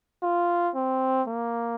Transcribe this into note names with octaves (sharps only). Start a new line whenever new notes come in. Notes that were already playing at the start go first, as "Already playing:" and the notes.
F4
C4
A#3